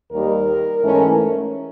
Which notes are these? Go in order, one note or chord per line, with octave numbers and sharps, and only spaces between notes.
D#2 D#3 G3 A#4
G#2 E3 A3 C#4